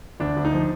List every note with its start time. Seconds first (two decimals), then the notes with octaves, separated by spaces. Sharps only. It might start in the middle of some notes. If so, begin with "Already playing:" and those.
0.20 D2 D4
0.37 D2
0.45 D#4
0.53 F3